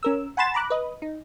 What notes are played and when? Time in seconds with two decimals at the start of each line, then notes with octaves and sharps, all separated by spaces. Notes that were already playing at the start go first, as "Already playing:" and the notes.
0.03 C#4 A#4 E6
0.37 F#5 G#5 B5 C6 A6 E7
0.54 A#5 B5 D6 F#6
0.70 B4 D#5
1.02 D#4